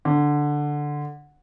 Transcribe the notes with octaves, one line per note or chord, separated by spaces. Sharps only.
D3